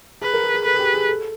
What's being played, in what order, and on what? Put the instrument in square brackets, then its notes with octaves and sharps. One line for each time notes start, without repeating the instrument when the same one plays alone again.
[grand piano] G#4 [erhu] B4
[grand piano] A#4
G#4
G#4
[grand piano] A4 [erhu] B4
[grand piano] G#4
G4
G#4
A4